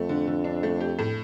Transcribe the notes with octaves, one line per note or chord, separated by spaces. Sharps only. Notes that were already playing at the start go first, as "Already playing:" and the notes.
Already playing: F2 A3
D3
D3
D4
A3
G4
A2